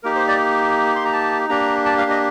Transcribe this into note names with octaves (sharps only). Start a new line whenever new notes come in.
A#3 D#4 G4 A#4
C5
D5
C6
A#5
A5
A#3 D4 G4 A#5
A5
F5
D#5